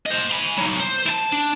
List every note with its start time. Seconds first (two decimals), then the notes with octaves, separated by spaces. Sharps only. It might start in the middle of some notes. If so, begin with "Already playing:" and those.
0.06 C5 D#5
0.32 G#5 B5
0.58 F#3 D#4
0.80 C5
1.06 E4 A5
1.33 D4